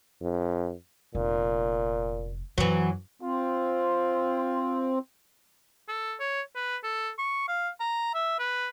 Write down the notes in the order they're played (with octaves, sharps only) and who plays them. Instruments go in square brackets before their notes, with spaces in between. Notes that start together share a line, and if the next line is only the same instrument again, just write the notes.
[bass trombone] F2
[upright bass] F1 [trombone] A#2
[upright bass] F#2 [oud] E3 F#3
[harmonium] C4 [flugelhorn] F4
[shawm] A4
C#5
B4
A4
C#6
F5
A#5
E5
B4